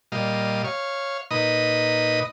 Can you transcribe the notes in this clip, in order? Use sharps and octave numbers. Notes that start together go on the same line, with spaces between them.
A#2 G3 D#5 F5
C#5 F5
A#2 D#4 B4 D#5 D#6